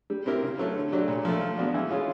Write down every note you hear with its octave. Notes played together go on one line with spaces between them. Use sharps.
G3
C4 E4 G4 A#4
C#3
F#3 A3
D3
F#3 A3 D4 G4
A#2
F3 A3
F3
G#3 B3 D4 F#4
E3
G#3 C#4 F4 G#4